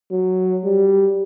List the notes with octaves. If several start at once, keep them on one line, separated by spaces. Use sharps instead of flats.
F#3
G3